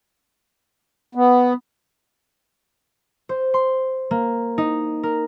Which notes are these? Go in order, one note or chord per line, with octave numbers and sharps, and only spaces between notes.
B3
C5
C6
A#3
D#4
A#4